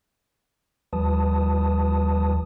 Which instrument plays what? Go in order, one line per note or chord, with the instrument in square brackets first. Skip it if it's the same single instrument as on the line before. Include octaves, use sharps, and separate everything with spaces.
[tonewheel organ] D#2 F3 G3 B4 A5 D#6